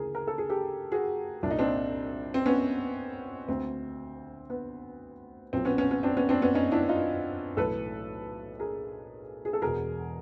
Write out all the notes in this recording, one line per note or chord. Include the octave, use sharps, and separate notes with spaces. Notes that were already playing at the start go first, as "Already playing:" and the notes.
Already playing: D2 C#3 E3 G#4 A#4
A#4
A4
G#4
G4 A4
F#4 G#4
C2 A#2 D4
D#4
C4 D4
C4
B3 C#4
D2 D3 C4
B3
B1 A#2 C4
B3 C#4
B3 C#4
B3 C#4
C4 D4
B3 C#4
C4 D4
B3 C#4
C#4 D#4
D4 E4
D#4 F4
B1 A2 E3 A4 B4
G#4 A#4
G#4
A4
E1 E2 B2 G#4 A#4